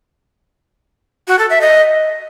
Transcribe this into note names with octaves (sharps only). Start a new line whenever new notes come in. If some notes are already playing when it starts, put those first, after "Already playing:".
F#4
A4
E5
D#5